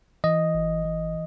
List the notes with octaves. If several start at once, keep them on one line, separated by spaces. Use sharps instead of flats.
E3 D#5
G#1
E3